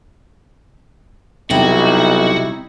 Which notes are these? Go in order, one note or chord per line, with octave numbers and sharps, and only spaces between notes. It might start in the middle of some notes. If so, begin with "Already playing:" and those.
B1 C3 G3 D#4 E4 F#4